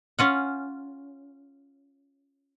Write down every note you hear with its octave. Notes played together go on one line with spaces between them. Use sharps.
C#4 F4 F#5